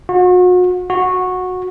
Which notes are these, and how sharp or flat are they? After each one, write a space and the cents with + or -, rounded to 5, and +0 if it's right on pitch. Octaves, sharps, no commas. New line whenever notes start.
F#4 -40
F#4 -15